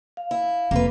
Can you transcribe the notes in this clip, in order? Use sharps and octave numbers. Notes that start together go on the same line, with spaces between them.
F5
E4
F1 F2 A#3 F4 B4